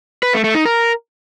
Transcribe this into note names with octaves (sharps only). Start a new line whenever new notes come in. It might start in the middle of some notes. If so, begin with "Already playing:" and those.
B4
A3
A3
D#4
A#4